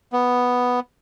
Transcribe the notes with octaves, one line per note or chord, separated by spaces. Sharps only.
B3